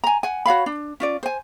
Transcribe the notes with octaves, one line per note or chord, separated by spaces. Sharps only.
G#5 A#5
F#5 G#5
F#4 C#5 F5 B5
D4
C#4 F4 D5
C5 G#5